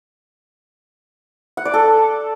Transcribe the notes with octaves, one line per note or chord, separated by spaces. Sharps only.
F#5
D5
A4